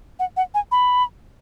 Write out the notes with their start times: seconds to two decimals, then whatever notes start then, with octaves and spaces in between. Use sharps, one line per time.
0.19 F#5
0.37 F#5
0.54 G#5
0.72 B5